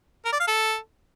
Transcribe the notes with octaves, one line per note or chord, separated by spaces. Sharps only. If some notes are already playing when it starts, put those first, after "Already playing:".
A#4
D5
F5
A4